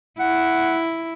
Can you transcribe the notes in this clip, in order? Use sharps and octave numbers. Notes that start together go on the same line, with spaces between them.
E4 F#5